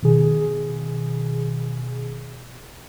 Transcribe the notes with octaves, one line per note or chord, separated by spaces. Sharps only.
B2 D#3 G#4